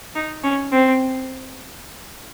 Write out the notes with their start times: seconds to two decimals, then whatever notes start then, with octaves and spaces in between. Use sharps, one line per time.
0.15 D#4
0.44 C#4
0.72 C4